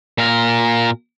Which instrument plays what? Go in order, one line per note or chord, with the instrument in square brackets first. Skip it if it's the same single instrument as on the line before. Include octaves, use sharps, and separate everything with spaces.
[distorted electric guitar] A#2 A#4